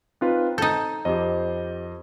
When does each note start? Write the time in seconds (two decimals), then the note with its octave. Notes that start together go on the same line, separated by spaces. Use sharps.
0.21 C4 D#4 F4 B4
0.58 D#4 A4 G6
1.05 F2 G4 C5 D#5